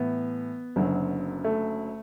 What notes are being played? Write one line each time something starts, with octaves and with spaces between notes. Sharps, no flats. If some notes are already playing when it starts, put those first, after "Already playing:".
Already playing: A2 E3 B3
F#1 F#2 D3 F#3
A3